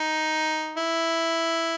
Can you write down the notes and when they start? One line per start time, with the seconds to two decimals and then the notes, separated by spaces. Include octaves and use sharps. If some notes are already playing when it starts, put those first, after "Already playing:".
Already playing: D#4
0.77 E4